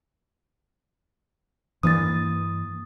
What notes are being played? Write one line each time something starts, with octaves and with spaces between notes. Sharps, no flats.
G2 E3 A#3 D#6 A6